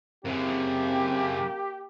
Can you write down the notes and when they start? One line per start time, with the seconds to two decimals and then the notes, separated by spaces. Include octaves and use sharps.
0.25 F#2 C#3 A#3 C4 G4